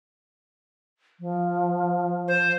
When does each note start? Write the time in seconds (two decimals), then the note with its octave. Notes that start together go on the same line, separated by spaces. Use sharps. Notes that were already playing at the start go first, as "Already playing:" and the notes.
1.20 F3
2.28 C5